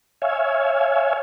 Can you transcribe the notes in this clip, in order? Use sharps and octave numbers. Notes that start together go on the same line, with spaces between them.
C#5 E5 F5 G#5